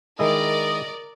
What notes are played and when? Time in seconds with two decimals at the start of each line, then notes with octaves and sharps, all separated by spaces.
0.19 D#3 G#3 E4 A#4 D5 D#5